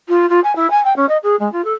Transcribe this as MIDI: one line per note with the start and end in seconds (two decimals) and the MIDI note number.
0.08 0.28 65
0.29 0.40 65
0.44 0.55 80
0.56 0.70 64
0.70 0.82 80
0.84 0.96 79
0.96 1.06 61
1.09 1.17 75
1.23 1.36 68
1.39 1.50 56
1.52 1.64 65
1.64 1.73 69